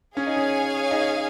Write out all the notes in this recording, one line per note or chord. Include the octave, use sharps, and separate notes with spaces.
C#4 G#4 C#5 F5 G#5
D#4
C#4
D#4